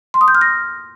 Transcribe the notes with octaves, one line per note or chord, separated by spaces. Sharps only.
C6
D#6
G6
F6
A#6